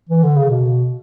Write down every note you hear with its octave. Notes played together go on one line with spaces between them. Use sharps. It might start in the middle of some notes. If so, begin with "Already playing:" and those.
E3
D3
C#3
B2